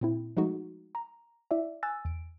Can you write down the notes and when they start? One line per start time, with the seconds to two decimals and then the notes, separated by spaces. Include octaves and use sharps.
0.01 A#2 C4 E4
0.37 F3 G#3 A3 D#4 F#4
0.95 A#5
1.51 E4 D5 E5
1.83 G#5 E6 F#6 A6
2.05 E2 D7